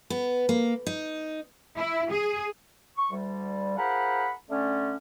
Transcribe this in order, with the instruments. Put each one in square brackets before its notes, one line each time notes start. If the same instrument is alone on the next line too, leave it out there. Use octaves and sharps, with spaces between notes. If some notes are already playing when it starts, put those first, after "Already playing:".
[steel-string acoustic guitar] B3
A#3
D#4
[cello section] E4
G#4
[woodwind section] C#6
D2 G3
F4 G#4 A#4 C5 F#5 B5
D3 A3 C#4